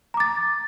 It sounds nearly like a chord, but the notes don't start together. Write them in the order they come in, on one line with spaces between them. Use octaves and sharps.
A#5 D6 A6